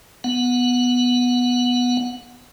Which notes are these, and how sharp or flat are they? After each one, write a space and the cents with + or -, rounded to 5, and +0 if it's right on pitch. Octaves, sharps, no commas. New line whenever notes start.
B3 +0 F#5 -20